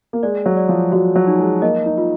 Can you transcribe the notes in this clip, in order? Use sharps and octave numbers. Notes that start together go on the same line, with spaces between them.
A#3
G#3 D5
F#3
D5
F3
F#3 F#4
F#3
D#4
G#3
A#3 D#5
D#4
F4